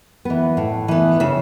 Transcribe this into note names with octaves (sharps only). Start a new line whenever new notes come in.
E3 B3
A2
E3 B3
C#3 E5